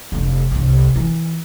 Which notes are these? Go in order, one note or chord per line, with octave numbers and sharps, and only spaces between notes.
F1 D4
G1 C2
E3